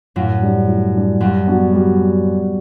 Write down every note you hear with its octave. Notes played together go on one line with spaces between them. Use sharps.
F#2 A2 F#3
G3 D4
A2
G3 D4
F#2 F#3 G3
B3 D4 F#4
G3